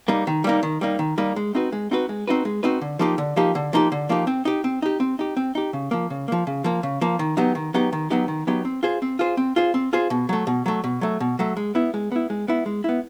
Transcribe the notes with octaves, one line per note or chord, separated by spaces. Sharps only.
G3 A#3 D#4
D#3
G3 A#3 D#4
D#3
G3 A#3 D#4
D#3
G3 A#3 D#4
G#3
C4 D#4 F#4 B4
G#3
C4 D#4 F#4 B4
G#3
C4 D#4 F#4 B4
G#3
C4 D#4 F#4 B4
D3
F3 A#3 D#4 G4
D3
F3 A#3 D#4 G4
D3
F3 A#3 D#4 G4
D3
F3 A#3 D#4 G4
C4
D#4 G4
C4
D#4 G4
C4
D#4 G4
C4
D#4 G4
C#3
F3 A#3
C#3
F3 A#3
C#3
F3 A#3
C#3
F3 A#3
D#3
F#3 B3 D#4 G4
D#3
F#3 B3 D#4 G4
D#3
F#3 B3 D#4 G4
D#3
F#3 B3 D#4 G4
C4
F4 G#4 C5
C4
F4 G#4 C5
C4
F4 G#4 C5
C4
F4 G#4 C5
B2
F#3 A3
B2
F#3 A3
B2
F#3 A3
B2
F#3 A3
G#3
B3 E4
G#3
B3 E4
G#3
B3 E4
G#3
B3 E4